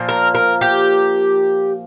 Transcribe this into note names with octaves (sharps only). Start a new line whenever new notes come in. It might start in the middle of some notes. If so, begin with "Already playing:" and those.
Already playing: A#2 F3 A#3
A#4
A#4
G4